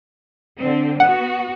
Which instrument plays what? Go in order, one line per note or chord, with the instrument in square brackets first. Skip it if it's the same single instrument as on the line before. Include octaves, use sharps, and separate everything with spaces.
[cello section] D3 C4
[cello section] B3 F#4 [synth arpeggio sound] F#5